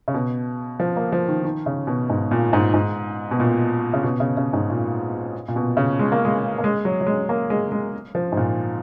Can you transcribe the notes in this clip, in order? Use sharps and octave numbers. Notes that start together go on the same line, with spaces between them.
C#3
B2
F3
A#3
F3
D#3
D#3
C#3
B2
G#2
A#2
G#2
G#2
B2
A#2
C#3
B2
C#3
C#3
G#2
A#2
A#2
B2
C#3
G#3
A#3
G#3
A#3
G#3
F#3
F#3
G#3
A#3
G#3
G#3
F3
G#2
A#2